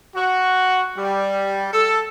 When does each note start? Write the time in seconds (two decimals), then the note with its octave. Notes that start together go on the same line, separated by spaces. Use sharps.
0.16 F#4
0.97 G3
1.72 A4